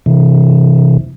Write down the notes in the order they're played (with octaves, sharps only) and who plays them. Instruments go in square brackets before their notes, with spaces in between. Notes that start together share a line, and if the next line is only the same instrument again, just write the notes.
[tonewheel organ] C3 E3